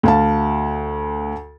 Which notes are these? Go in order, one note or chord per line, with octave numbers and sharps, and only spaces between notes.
D2 F5 A5